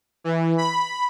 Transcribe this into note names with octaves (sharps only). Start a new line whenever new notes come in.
E3
B5